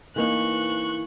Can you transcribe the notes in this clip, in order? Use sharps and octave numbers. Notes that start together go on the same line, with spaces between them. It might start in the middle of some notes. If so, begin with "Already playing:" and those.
E3 A#3 D#4 C#6 F#6